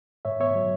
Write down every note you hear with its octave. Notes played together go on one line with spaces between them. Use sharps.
G#2 C#5 E5
B3 C#5 E5
F#3